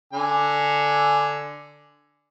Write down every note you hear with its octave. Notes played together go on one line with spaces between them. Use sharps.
D3 G#5